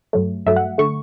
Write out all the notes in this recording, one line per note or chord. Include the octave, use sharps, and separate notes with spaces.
G2 F#3 A3
G2 F#3 A3 E5
F#5
D3 A3 C#6